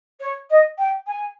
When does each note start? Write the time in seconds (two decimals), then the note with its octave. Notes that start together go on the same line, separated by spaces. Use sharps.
0.20 C#5
0.50 D#5
0.78 G5
1.06 G#5